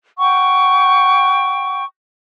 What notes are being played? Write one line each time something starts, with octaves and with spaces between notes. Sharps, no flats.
F#5 G5 C#6